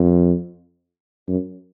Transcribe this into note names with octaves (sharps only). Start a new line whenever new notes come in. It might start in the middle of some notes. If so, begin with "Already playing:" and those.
Already playing: F2
F#2